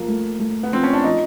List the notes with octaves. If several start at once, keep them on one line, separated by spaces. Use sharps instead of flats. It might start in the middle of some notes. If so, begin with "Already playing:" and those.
Already playing: F3 A#3
A3
A3
B3
F3 C4
C#4
D4
F3 D#4